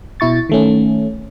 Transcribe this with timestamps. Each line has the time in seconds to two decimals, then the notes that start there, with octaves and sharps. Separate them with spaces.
0.20 B2 E4 C#6 A6
0.49 D#3 A3 C#4